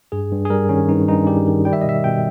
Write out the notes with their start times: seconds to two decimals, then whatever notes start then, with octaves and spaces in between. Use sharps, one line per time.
0.12 G2 G#4
0.32 G2
0.45 G#4
0.50 G3 A#4
0.69 D#3 C#4
0.89 G2 D#4
1.08 G2 D#4
1.27 G3 G4
1.47 D#3
1.65 G3 G5
1.73 E5
1.81 D#5
1.85 B2 E5
2.04 B2 G5